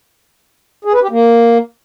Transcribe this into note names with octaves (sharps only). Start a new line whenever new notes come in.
G#4
B4
G4
A#3